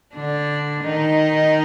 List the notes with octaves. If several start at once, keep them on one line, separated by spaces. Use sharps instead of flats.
D3 D4
D#3 D#4